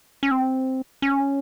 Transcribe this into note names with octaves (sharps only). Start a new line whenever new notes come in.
C#4
C4
C#4